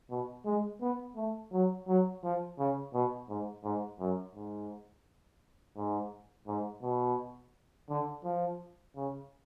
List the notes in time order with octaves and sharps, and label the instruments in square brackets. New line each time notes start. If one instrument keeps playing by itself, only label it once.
[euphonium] B2
G#3
B3
A3
F#3
F#3
F3
C#3
B2
G#2
G#2
F#2
G#2
G#2
G#2
B2
D3
F3
C#3